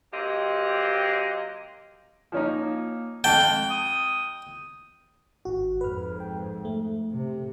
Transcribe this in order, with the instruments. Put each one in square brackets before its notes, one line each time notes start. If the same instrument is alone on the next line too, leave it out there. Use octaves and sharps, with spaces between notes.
[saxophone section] F#3 A#3 C4 G4 D#5
[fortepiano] F3 C#4 D#4 [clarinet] A#3
[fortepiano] F2 A5 [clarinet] G#3 [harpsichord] G5
[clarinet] D#6
[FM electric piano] G#1 F#4
[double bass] F2 G#2 [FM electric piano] B4 F6
[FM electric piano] G5
A3
[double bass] C3